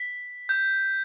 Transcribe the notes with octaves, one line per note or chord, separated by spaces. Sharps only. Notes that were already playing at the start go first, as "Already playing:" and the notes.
Already playing: B6
G6